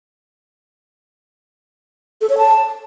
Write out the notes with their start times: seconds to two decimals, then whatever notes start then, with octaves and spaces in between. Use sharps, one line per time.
2.21 A4
2.30 C#5
2.38 A5